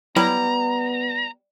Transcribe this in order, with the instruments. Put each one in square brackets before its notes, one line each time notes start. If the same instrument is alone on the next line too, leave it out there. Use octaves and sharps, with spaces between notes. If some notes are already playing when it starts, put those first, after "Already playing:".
[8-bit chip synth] F#3 E4 [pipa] G3 [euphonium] B3 [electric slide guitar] A#5